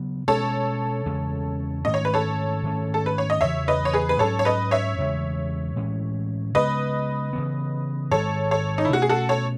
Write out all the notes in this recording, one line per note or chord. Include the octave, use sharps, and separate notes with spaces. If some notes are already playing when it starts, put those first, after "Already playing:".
Already playing: C#3 F#3 B3
B2 G#3 C#4 A4 C#5
E2 C#3 G#3 C#4
G#2 D#3 A3 C#4 D#5
C#5
B4
A4 C#5
G#2 D#3 A3 C#4
A4
B4
C#5
D#5
E2 C#3 E3 C#5 E5
B4 D#5
C#5
G#4 B4
B4
G#2 F#3 C#4 A4 C#5
C#5
B4 D#5
C#5 E5
E2 C#3 E3 G#3
A2 E3 G#3 C#4
C#3 G#3 B3 B4 D#5
C#3 E3 B3
G#2 D#3 G#3 A4 C#5
A4 C#5
D#4
E4
B2 A3 C#4 F#4
G#4
F#4 A4
A4 C#5